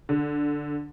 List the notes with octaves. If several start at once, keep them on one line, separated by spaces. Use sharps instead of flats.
D3